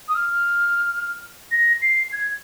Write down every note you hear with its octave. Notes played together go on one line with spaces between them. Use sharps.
D#6
F6
A#6
C7
G#6